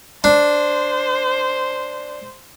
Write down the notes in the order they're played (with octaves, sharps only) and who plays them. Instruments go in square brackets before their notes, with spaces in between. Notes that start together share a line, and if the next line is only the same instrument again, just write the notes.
[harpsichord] D4 [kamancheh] C5